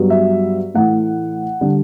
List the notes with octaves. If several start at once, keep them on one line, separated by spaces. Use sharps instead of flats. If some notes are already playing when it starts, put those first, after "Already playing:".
Already playing: G2 F#3 B3
E5
A2 E3 A3 F#5
D3 G3